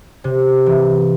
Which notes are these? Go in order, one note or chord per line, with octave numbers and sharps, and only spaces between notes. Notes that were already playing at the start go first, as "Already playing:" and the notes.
C3
E3